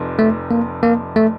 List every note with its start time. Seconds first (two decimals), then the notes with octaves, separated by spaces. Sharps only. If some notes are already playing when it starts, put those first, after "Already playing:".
Already playing: F1 F2 C3
0.19 A3
0.51 A#3
0.83 A#3
1.16 A3